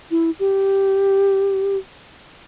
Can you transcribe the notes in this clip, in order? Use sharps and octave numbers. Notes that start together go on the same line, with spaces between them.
E4
G4